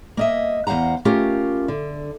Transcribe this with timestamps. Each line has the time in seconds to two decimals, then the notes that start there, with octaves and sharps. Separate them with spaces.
0.17 A#3 D#5 E5
0.67 E2 C5 F5 F#5 A#5
1.05 A3 C#4 F4 G4 A#4
1.68 D3